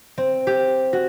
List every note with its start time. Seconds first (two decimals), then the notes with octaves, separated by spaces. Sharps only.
0.18 C4
0.47 G4
0.93 F#4